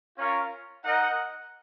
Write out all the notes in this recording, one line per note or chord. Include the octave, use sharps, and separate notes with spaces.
C#4 F4 A#4 C#5 F5
D#4 A#4 D#5 F#5